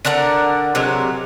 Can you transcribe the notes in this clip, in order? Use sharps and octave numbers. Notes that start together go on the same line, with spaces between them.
D3 D4 A#4 F#5
C3 F#3 G#3 A#4